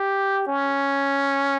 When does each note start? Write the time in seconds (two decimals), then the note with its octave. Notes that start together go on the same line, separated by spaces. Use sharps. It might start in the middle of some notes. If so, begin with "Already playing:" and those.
Already playing: G4
0.47 C#4